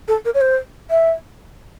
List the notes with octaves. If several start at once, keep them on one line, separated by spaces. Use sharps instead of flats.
A4
A#4
C#5
C5
E5